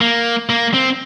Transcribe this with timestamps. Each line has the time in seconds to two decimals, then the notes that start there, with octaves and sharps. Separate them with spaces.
0.01 A#3
0.49 A#3
0.74 C4